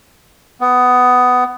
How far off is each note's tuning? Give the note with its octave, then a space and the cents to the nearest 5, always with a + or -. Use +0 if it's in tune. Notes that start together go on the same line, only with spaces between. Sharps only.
B3 +15